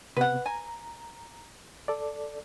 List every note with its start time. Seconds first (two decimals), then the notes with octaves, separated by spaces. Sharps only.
0.17 C3 B3 B4 F#5
0.46 G#5 A#5
1.88 A4 D5